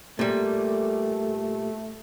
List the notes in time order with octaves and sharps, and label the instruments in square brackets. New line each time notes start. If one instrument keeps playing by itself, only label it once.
[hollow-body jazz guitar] A#2 G3 [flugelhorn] A3